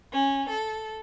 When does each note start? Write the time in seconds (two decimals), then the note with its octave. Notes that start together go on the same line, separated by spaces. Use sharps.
0.13 C#4
0.49 A4